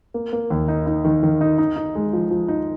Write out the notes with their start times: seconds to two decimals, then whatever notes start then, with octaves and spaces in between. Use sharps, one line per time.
0.14 A#3
0.33 A#3
0.50 D#2
0.68 D#4
0.87 D#4
1.05 D#3
1.23 D#3
1.41 D#4
1.58 D#4
1.76 D#4
1.95 G#3
2.13 F3
2.31 F3
2.48 D#4